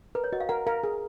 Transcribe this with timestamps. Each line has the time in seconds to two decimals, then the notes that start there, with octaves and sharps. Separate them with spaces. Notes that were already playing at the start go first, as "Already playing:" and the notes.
0.15 A#4 B4
0.24 C#5
0.32 F#4 D#5
0.40 F5
0.49 A#4 F#5
0.67 A#4 F5
0.84 G#4